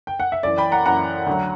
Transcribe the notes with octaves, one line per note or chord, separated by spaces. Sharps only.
G5
F#5
E5
F#2 E3 D5
G5 B5
F#5 A#5
F#2 E3 F#5 A#5
D2 D3 F#3